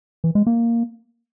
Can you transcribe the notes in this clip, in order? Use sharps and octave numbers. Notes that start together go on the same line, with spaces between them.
E3
G#3
A#3